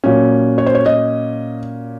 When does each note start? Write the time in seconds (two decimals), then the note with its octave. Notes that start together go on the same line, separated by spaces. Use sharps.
0.04 A#2 F#3 C#4
0.58 C#5
0.66 C5
0.75 C#5
0.86 D#5